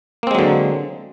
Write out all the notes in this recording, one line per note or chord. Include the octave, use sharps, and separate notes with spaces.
D3 F#3 G#3 A#3 C4